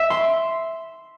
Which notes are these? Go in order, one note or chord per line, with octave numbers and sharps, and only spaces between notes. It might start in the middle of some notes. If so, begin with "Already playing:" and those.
Already playing: E5
C6